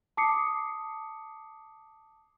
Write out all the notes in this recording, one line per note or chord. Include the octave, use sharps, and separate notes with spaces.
A5 D6 D#6 C7 C#7